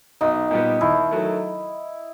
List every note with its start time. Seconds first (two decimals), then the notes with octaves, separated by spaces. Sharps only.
0.21 B1 D#4
0.51 A#2 G3 B3
0.81 D#2 E4
1.11 D#3 F#3 A3